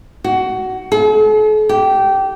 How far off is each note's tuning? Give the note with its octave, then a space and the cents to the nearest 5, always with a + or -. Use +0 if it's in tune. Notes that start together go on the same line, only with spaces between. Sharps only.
F#4 +20
A4 -45
G4 -15